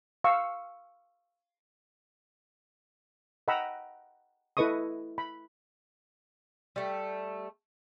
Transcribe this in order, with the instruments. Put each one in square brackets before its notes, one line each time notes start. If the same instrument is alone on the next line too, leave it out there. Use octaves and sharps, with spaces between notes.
[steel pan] F5 C#6 E6
D#5 F#5 G5 A#5 B5 E6
E4 A4 B4 D#5 C#6 D#6
B5
[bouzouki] G3 A3